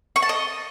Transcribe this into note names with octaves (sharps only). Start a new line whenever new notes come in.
C#6
A5
D#5